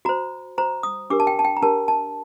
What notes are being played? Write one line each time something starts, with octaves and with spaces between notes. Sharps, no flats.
F#4 C5 A#5
F#4 C5 A#5
D#6
D4 G4 A#4 D6
A5
G5
A5
G5
A#5
D4 G4 A#4 A5
A5